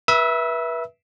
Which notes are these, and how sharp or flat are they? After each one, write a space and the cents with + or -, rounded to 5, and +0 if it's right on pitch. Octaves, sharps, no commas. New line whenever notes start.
B4 -30 E5 +0 E6 -40